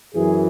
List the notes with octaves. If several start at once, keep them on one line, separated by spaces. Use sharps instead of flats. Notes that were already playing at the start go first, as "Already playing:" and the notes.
F#2 E3 G#4